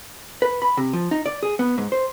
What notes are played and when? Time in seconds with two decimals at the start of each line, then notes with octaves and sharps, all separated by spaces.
0.42 B4
0.62 B5
0.77 C3
0.93 F3
1.11 D#4
1.26 D5
1.43 G#4
1.59 B3
1.78 G#2
1.92 C5